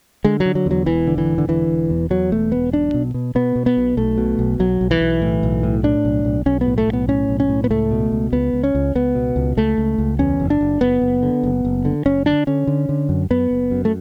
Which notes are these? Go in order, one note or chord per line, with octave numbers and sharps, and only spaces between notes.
D3 G#3
F#3
D3
F#3
E2 F#3
E1 E3
D3
E3
E1
D3
D3 E3
E1
E2
E2 F#3
E1 A3
E1 B3
B1 D4
B2
B2
B2 B3
B2
B3
B1
B1 A3
B2
B1
B1 F#3
B1
E3
B1
A2
B1
A2
A2 D4
B1
B1
B1 C#4
B3
A2
A3
B1
B3
A2 C#4
B1
C#4
A2
B3
C#2 A3
B2
C#2
C#2 B3
C#2
C#4
C#2
C#2 B3
B2
C#2
C#2 A3
C#2
C#2
E2 C#4
F#1
D4
F#1
F#1 B3
F#1
D3
F#1
F#1
D3
F#1 C#4
D3 D4
D3 C#4
D3
D3
F#2
F#2 B3
F#1
F#2
A3